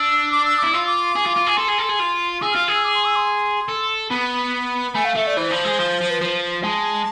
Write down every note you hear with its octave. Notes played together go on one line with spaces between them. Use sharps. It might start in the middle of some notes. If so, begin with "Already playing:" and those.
Already playing: D4 E6
D6
E6
E4 D6
F4 E6
D6
G#4
F4
F4
G#4
A4 C6
G#4
A4
G#4
F4
G#4 E6
F4 F6
G#4
E6
D6
C6
E6
C6
A4
B3 B5
A3 G#5
F5
A3 E5
D5
E3 C5
F3
G#3
F3
F3
B4
F3 C5
G#3 A5